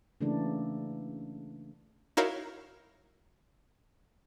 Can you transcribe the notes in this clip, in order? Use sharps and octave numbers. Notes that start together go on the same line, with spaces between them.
C#3 E3 A3 A#3 D4
D#4 E4 F#4 A#4 C#5 F5